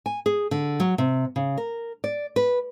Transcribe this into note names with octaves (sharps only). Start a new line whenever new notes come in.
G#5
G#4
D3
F#3
C3
C#3
A#4
D5
B4